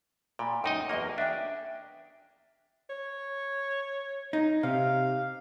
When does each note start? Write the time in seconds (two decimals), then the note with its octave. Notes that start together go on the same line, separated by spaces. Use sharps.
0.39 A#2 G5 B5
0.64 F#2 D#4 D#5 G5
0.89 E2 A#3 F#4 D#5
1.18 D4 E5 G5
2.90 C#5
4.33 D#4
4.63 C3 F5